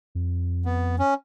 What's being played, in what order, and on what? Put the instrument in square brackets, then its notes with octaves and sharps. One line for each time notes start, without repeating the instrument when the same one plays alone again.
[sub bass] F2
[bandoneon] B3
C#4